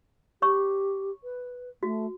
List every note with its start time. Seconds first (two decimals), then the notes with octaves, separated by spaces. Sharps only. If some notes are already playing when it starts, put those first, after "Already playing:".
0.42 G4 C#5 C#6
1.24 B4
1.83 A3 F#4